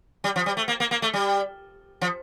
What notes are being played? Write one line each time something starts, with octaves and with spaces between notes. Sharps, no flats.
G3
F3
G3
A3
A#3
A#3
A#3
A3
G3
F3